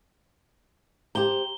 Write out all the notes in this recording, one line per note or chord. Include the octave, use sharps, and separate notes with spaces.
G4 C5 A#5 G7